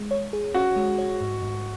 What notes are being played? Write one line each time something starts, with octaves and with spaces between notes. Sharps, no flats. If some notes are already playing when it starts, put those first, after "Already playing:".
Already playing: G#3
C#5
G#4
C#4 F#4
G#3
C#5
G#2
G#2